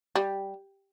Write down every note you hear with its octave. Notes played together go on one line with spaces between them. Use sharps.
G3